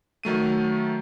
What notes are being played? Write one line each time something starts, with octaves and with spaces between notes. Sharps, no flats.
D#3 F#3 A3 D#7